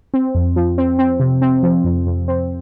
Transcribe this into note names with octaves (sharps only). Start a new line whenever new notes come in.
C4
F2
F3
C4
C4
C3
C4
F3
F2
F2
C4